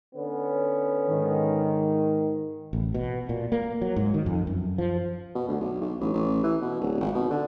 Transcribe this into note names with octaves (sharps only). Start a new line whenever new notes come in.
D3 B3 C#4
G#2 D#3
A1
B2
A#2
A#3
F#3
G#2
D#3
F2
F#2
F3
B2
D2
B1
B1
A1
A1
E3
B2
D1
G#1
B2
D3